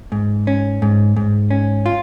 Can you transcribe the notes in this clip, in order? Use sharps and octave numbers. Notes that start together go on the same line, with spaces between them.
G#2
C#4
G#2
G#2
C#4
F4